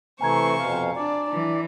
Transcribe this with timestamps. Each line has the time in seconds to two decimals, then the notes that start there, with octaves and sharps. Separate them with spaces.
0.21 C3 E3 A3 C5 G#5 A#5 C#6 G#6
0.59 F2 B2 F5
0.96 D4 D5
1.33 E3